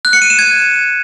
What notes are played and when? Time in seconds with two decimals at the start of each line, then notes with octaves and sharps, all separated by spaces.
0.05 F#6
0.13 C#7
0.22 D#7
0.30 E7
0.39 G#6